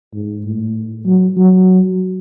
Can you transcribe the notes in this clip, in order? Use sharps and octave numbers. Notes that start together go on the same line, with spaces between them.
G#2
A2
F#3
F#3